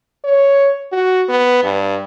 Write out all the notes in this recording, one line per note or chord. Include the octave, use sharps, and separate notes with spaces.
C#5
F#4
B3
G2